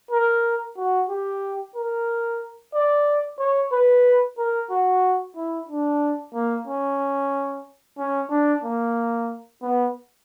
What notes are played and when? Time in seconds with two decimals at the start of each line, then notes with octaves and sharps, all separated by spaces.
0.11 A#4
0.77 F#4
1.09 G4
1.76 A#4
2.74 D5
3.39 C#5
3.72 B4
4.38 A#4
4.70 F#4
5.36 E4
5.69 D4
6.34 A#3
6.67 C#4
7.98 C#4
8.30 D4
8.64 A#3
9.62 B3